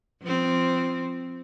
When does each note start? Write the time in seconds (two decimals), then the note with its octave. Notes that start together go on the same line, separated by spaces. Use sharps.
0.22 F3 C4